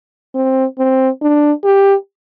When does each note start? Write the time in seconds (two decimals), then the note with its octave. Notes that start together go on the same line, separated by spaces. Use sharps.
0.35 C4
0.78 C4
1.22 D4
1.64 G4